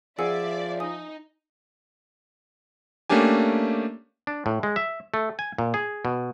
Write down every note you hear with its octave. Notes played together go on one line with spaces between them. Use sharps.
F3 G#4 D5 E5 F#5 G#5 E6
D#4 G#5 D#6
A3 A#3 C#4 D4 G4 G#5
D4
A2
G#3
E5
A3
G#5
A#2
G#4
B2